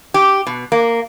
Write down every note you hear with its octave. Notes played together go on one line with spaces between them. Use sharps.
G4
B2
A#3